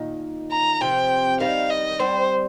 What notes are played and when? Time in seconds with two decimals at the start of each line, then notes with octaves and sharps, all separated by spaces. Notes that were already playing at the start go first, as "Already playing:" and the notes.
Already playing: A#2 D#3
0.52 A#5
0.81 C3 F3 G5
1.40 D#3 G3 F5
1.70 D#5
2.00 G3 C4 C5